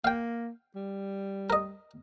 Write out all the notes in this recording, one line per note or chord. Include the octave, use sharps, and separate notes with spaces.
A#3 F5 G5
G3
A#4 D#5